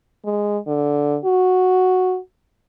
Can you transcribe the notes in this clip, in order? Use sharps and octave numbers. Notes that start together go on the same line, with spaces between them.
G#3
D3
F#4